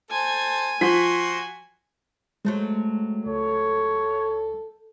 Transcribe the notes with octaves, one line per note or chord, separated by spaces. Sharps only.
A4 C5 G#5
F3 F#4 C6 B6
F#3 G#3 A3 C4
C#2 A4 C#5